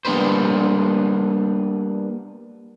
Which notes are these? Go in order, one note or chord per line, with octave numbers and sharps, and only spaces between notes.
G3 A#3 B3 D4 B4 C5